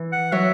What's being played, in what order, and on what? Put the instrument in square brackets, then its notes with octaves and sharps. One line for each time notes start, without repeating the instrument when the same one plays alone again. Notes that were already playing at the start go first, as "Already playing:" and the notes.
Already playing: [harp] E3
[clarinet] F#5
[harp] F#3 [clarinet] E5